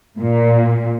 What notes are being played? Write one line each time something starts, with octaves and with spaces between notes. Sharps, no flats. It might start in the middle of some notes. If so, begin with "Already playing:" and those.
A#2